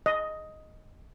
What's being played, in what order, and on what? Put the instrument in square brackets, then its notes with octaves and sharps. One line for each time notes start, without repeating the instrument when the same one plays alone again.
[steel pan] D#5